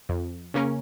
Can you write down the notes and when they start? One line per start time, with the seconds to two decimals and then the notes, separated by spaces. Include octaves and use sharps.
0.09 F2
0.54 C#3 A#3 C#4 A#4